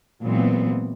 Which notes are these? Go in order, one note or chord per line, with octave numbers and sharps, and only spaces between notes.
A#2 E3 F#3 G#3 B3 C4